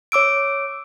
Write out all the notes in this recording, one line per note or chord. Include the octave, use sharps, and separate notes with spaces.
C#5 D6 E6 D7